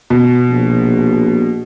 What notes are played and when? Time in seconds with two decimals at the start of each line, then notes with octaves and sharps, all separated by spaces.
0.10 B2
0.48 A#1